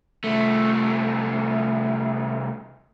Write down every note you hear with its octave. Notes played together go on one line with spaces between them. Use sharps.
C2 A3